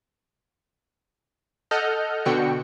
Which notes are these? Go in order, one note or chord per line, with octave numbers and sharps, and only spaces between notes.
A4 D#5 F#5 F6 G6
B2 D3 F#4 G5 C#7